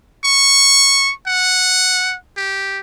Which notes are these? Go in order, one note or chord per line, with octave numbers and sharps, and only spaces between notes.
C#6
F#5
G4